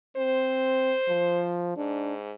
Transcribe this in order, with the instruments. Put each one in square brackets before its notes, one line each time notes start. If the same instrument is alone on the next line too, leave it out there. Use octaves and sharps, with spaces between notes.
[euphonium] C4 [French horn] C5
[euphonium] F3
[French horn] G#2 [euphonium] D4